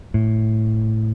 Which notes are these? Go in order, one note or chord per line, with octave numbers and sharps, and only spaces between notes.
A2